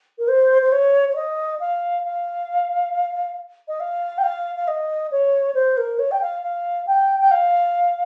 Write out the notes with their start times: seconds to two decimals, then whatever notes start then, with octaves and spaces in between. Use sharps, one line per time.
0.19 A#4
0.28 C5
0.62 C5
0.72 C#5
1.09 C#5
1.16 D#5
1.60 F5
2.04 F5
3.68 D#5
3.80 F5
4.18 G5
4.23 F5
4.56 F5
4.67 D#5
5.11 C#5
5.54 C5
5.77 A#4
5.99 C#5
6.11 G5
6.21 F5
6.43 F5
6.87 G5
7.20 G5
7.31 F5